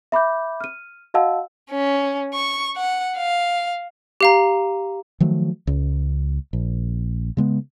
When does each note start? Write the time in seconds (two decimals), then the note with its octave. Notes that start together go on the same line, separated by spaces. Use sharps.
0.12 E5 B5 D6 G6
0.61 F6 D#7
1.14 F#4 D#5 F5 F#5 A5 E6
1.71 C#4
2.34 C#6
2.77 F#5
3.17 F5
4.21 G4 F5 A#5
5.20 D#3 F3 F#3 A3
5.67 C#2
6.53 A#1
7.37 C#3 G#3 B3